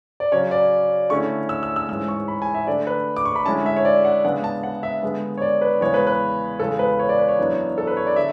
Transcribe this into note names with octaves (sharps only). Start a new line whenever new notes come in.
D5
C#3 F#3 C#4 C#5
D5
D3 A3 C#4 E4 C#6
E6
E6
E6
G#2 E3 G#3 C#4 E6
C#6
B5
G#5
E5
D3 A3 D4 D5
B4
D6
C#6
B5
D3 G#3 C#4 E4 A5
E5
C#5
D5
F#5
C#3 G#3 B3 D4 F#5
A5
F#5
E5
D3 G#3 B3
C#5
D5
B4
E2 C#3 G#3 C#5
B4
B4
E2 C#3 G#3 A4
B4
C#5
D5
B4
C#5
F#2 E3 B3 D4
A4
B4
C#5
D5
D3 E5